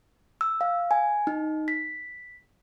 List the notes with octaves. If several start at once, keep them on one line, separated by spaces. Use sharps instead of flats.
E6
F5
G#5
D#4
B6